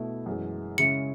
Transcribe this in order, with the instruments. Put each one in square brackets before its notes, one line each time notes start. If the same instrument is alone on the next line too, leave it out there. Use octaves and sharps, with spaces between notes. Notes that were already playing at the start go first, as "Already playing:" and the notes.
Already playing: [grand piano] B2 A3 E4
F#2 E3 G#3
[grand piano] C#3 G#3 C#4 E4 [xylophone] C#7